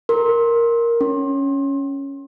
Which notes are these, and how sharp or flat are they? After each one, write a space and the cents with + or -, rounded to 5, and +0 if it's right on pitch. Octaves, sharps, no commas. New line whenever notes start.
A#4 +0 C6 +15
C#4 +0 C6 +30